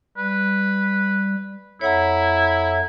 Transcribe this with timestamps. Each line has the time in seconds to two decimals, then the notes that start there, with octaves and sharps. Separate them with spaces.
0.17 G3 B4
1.81 F2 E4 A4 C#5 E5 F#5 A#5